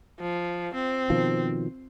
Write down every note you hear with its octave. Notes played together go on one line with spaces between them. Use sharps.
F3
C4
B2 D#3 F3